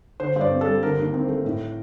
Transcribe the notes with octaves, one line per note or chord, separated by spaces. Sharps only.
D3 C5
G2 C5
D5
C4
A4
G3
D3 A#4
D#2
C4
A3
A2